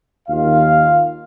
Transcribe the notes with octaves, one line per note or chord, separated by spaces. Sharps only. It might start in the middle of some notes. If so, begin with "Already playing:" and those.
D#2 D#3 F4 F5